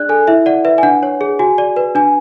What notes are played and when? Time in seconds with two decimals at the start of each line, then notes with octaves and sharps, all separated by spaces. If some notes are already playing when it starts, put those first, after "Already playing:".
Already playing: D4 G#4 D5 F#6
0.09 A4 G#5
0.27 E4 E5
0.46 D5 F#5
0.65 B4 E5
0.78 G#5
0.83 D4 F#5
1.03 C#5
1.21 G#4
1.39 F#4 G#5
1.58 D5
1.77 B4
1.95 D4 G#5